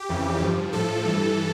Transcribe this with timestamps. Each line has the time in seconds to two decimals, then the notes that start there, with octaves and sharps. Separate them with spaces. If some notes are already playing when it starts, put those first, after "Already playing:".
Already playing: G4
0.09 F2 C#3 E3
0.40 G2 F3
0.73 A2 F3 A4
1.05 G2 E3